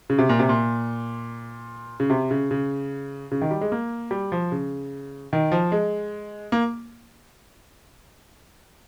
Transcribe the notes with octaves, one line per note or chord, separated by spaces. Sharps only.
C#3
C3
A#2
C3
A#2
C#3
C3
C#3
C#3
C#3
D#3
G3
G#3
A#3
G3
F3
C#3
D#3
F3
G#3
A#3